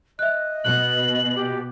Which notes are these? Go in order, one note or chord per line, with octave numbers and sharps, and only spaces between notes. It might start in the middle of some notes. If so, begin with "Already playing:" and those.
D#5 E5 F#6
B2 F#6 F#7
G4